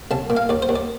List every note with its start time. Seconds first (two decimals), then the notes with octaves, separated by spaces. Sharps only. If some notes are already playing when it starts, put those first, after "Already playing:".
0.11 C2 A5
0.30 A#2
0.37 F5
0.49 D#2 D5
0.62 C5
0.69 D#2
0.76 D5